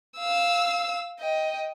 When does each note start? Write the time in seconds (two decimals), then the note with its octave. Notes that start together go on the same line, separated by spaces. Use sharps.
0.19 F5 E6
1.20 D#5 G5